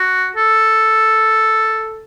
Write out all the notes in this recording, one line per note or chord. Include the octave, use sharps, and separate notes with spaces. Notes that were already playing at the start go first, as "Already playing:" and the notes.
Already playing: F#4
A4